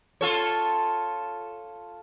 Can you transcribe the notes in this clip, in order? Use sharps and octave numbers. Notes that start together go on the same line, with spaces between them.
F4 A4 C#5